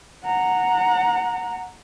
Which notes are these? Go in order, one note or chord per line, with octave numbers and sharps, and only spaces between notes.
F#5 A#5